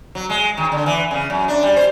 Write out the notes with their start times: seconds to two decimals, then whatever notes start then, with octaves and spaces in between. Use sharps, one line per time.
0.15 F#3
0.30 G#3
0.57 D#3
0.72 D3
0.86 E3
1.11 C#3
1.30 F#2
1.48 D4
1.63 G3
1.76 C5